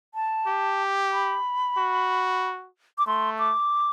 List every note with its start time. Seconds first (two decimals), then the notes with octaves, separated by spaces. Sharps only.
0.15 A5
0.47 G4
1.13 B5
1.78 F#4
2.98 D6
3.07 A3 C6
3.39 D6